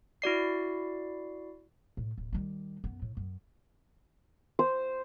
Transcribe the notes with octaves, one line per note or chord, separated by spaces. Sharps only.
E4 F#4 D5 C7
A2
D1
D#3 G3
F#2 B3
A2
F#2
C5